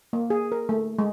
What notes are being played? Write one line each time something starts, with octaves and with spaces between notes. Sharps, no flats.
A#3
G#4
A#4
A3
G#3